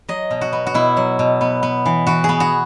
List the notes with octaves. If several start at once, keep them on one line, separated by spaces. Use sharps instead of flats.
F#3 D#5
B2
F#4
B3
F#4
B2 E4
F#3
B2
B3
B3
E3
E3 F#4
B3 G#4
F#4